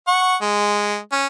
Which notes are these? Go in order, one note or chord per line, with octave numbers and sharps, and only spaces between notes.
F#5 C#6
G#3
C#4